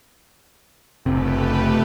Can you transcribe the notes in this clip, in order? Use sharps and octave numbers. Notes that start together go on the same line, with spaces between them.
F#1 C3 A3 G4 B4